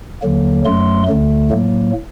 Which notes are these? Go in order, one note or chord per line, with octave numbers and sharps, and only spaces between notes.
D#2 D3 F#3 A#3
F#2 F#3 A3 C6
D2 D3 A3
A2 F#3 A#3